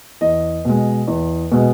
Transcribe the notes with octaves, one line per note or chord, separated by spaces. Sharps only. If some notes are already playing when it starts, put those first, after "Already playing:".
E2 D#5
B2 G#3
E2
B2 G#3